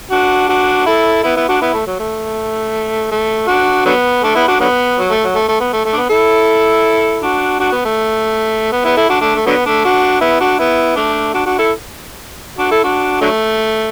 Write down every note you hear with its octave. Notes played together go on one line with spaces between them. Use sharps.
D4 F#4
D4 F#4
E4 A4
B3 E4
B3 E4
D4 F#4
B3 E4
A3
F#3
A3
A3
D4 F#4
D3 F#3 B3
A3 D4
B3 E4
D4 F#4
D3 F#3 B3
F#3
A3
F#3
A3
A3
B3
A3
A3
D4
B3
E4 A4
D4 F#4
D4 F#4
B3
A3
B3
B3 E4
E4 A4
D4 F#4
A3 D4
A3
D3 F#3 B3
A3 D4
D4 F#4
B3 E4
D4 F#4
B3 E4
A3 D4
D4 F#4
D4 F#4
E4 A4
D4 F#4
E4 A4
D4 F#4
D3 F#3 A3